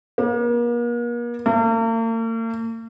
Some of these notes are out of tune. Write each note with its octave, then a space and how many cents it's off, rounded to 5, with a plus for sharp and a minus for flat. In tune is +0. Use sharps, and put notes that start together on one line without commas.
A#3 +40
A#3 -45